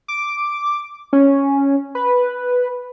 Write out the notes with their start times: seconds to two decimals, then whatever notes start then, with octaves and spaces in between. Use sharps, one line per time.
0.08 D6
1.13 C#4
1.95 B4